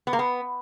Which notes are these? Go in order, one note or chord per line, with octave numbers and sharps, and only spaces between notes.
B3
A#3
B3